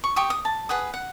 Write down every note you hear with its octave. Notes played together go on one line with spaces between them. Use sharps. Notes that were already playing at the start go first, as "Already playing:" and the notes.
C#6
G4 G5 C#6 D#6
D#6
A5
G#4 B4 F#5 D#6
F#5